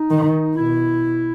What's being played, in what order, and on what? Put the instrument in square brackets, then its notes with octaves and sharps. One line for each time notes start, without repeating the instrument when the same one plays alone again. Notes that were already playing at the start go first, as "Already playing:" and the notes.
Already playing: [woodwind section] D#4
[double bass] D#3
[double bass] B2 [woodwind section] E4